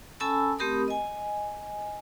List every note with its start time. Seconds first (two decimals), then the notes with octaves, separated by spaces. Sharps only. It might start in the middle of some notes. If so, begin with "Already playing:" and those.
0.20 C#4 A4 G#5 A5 B5 E6
0.59 A3 C4 G4 A#4 B5 D#6
0.88 D#5 G#5